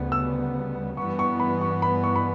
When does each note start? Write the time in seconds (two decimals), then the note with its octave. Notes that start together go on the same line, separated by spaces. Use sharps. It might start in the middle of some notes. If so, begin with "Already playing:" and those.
Already playing: D2 C#3 G3 B3
0.12 E6
0.97 G2 E3 G3 B3 C#6
1.19 C#6
1.40 B5
1.61 C#6
1.82 B5
2.04 C#6
2.16 B5